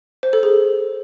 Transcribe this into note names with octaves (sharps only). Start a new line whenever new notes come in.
C5
A4
G#4